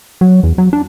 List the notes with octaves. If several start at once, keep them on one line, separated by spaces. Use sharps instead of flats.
F#3
E2
F#3
D4